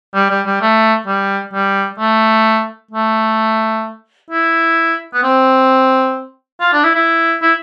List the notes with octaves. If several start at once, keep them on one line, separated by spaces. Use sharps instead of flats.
G3
G3
G3
A3
G3
G3
A3
A3
E4
B3
C4
F4
D4
E4
E4
E4